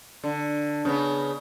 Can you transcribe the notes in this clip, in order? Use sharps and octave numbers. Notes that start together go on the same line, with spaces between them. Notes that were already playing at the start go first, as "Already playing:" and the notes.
D3
C#3 B3